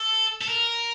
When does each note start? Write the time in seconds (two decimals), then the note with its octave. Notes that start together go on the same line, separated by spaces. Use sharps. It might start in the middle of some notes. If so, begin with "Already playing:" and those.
Already playing: A4
0.41 A4
0.49 A#4